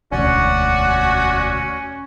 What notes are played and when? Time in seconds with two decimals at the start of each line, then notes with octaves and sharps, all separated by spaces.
0.12 E1 D2 C#4 F#4 D5 F#5